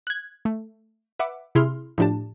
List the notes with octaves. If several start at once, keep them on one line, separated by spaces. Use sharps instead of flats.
F#6 G#6
A3
B4 E5 F#5 D6
C3 E4 G#4 C6 F6
A2 F3 D4 G4 A5